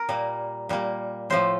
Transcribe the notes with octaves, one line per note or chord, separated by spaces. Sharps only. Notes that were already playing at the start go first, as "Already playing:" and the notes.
Already playing: A#4
A#2 G3 A#3
A#2 G3 A#3
A2 F3 A3 C5